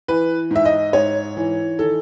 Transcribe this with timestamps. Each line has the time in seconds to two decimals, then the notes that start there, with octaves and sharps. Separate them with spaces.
0.08 E3 B4
0.51 G#2 E5
0.65 D#5
0.93 G#2 C#5
1.37 E3
1.79 D#3 A4